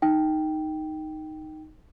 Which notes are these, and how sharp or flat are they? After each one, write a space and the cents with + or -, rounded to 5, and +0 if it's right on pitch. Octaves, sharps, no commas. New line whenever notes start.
D#4 +0 G5 +0